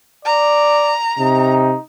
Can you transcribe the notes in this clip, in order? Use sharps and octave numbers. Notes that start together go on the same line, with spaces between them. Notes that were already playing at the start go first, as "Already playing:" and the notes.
D5 A#5
C3 D#4